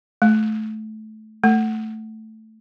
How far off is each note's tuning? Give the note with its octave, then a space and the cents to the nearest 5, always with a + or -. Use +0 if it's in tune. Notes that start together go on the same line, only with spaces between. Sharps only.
A3 -20
A3 +0